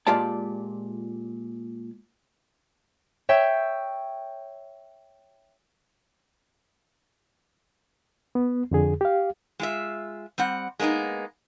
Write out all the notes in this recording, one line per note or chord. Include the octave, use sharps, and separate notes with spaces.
A#2 G#3 F4 G4 D5 A5
C#5 E5 G5
B3
F2 D3 G#4
G4 F5
G#3 F4 E5
G3 C4 F#5
G#3 A#3 B3 D4 D#4